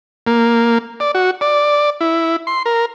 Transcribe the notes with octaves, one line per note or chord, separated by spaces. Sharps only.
A#3
D5
F#4
D5
E4
C6
A#4